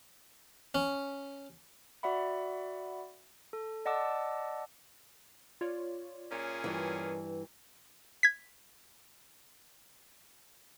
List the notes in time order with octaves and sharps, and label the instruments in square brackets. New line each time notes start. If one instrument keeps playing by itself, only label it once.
[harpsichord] C#4
[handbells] F#4 D5 E5 F#5 B5
A4
D5 D#5 F#5 A5 D6 E6
[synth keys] F4 C#5 D5
[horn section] A#2 C#4 G#4
[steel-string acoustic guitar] G2 E3
[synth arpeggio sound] G#6 B6